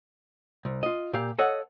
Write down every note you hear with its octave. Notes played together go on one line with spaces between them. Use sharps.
C2
F4 D#5
A#2 G4 F5
A4 C#5 D#5 F5 F#5